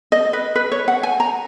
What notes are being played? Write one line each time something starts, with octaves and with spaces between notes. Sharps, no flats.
D#5
B4
B4
C#5
F#5
G#5
A#5